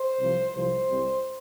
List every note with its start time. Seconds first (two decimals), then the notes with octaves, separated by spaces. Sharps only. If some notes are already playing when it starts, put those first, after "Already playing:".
Already playing: C5
0.20 C2 C3 F3
0.54 C2 C3 F3 C5
0.89 C2 C3 G3